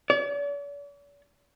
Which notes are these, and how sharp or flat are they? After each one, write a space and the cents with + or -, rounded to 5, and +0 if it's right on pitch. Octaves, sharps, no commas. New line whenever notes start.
D5 -45